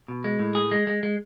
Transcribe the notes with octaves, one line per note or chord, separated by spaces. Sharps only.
B2
G#3
A2
G#4
G#3
G#3
G#3